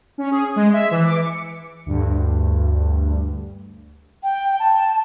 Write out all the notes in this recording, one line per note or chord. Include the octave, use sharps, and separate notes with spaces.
C#4
G#4
G#3
E5
E3
D6
C#7
D2 G2
G5
A5